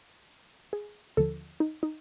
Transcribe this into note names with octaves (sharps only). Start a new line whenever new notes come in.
G#4
D#2 D3 F3 A4
D#4
D#4